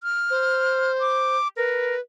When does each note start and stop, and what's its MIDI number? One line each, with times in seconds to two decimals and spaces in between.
0.03 0.92 89
0.30 1.37 72
1.00 1.48 86
1.57 1.95 70
1.57 2.00 71